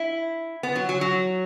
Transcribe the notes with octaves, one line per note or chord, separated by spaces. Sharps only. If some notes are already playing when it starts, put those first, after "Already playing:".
Already playing: E4
B3
F#3
F#3
F#3